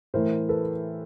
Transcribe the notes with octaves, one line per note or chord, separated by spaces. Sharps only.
A2 E3 A#4 C5
A4 B4